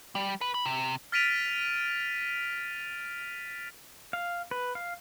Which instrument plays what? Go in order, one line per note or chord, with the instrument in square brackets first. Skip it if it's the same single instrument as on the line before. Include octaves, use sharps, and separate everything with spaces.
[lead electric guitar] G3
B4
B5
C3
[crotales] F6 A6 B6 D7 D#7 F7
[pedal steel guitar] F5
B4
F5